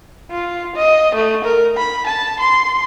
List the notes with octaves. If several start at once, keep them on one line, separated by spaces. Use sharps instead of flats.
F4
D#5
A3
A#4
B5
A5
C6